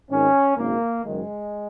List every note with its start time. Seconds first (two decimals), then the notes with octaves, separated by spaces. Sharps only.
0.09 G#1 G#2 D#3 C#4
0.56 G#1 F#2 C#3 A#3
1.04 F#1 F#2 D#3 G#3